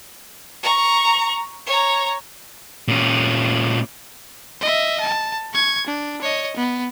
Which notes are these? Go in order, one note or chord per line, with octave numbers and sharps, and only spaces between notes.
A#5 C#6
C#5 A#5
A#2 C#4
D#5 E5
A5
C#6 G#6
D4
C#5 D#5
B3